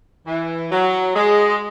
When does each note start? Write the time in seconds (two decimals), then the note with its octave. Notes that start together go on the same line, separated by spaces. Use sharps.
0.27 E3
0.72 F#3
1.16 G#3